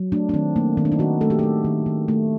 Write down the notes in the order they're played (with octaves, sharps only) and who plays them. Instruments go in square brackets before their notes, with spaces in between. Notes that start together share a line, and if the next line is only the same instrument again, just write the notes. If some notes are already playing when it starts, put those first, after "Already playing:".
Already playing: [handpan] F#3
A3 D4
D4
D#3 C4
A3 A#3
D#3 C4
D4
D#4
D#3 F#4
A3 A4
G4
A3 A4
D#3
D#3
A3